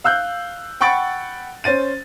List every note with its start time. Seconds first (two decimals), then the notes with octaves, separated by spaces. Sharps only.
0.04 F5 E6 F#6 G6
0.81 F#5 G5 B5 C#6 A6 D7
1.64 C#4 C5 A6 D#7